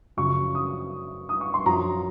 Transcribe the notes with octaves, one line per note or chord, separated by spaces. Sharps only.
F#2 C#3 F3 C#6
D#6
D#6
C#6
C6
F#2 F3 A#5